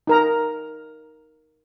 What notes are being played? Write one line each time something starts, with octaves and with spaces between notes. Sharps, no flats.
D#4 A#4 A#5